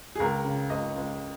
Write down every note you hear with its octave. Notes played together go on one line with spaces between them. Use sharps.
G#4
C#2 A#4
C#3
C#2 D#5
C#2